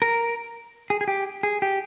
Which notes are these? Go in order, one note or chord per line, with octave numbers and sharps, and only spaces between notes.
A#4
G#4
G#4
G4
G#4
G4